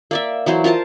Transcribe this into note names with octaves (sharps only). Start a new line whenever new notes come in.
A#3 D5 E5
E3 F#3 E4 C5
F4 A#4 C5 A5